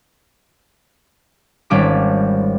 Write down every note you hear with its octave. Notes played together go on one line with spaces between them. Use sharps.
G#1 G3 C#4 F4 D6 B6